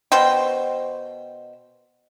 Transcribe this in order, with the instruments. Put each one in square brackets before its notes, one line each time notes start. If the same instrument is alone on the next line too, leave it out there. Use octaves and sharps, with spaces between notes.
[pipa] B2 C5 G5